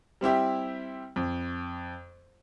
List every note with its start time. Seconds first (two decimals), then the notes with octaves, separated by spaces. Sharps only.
0.21 G3 C4 E4 G4
1.16 F2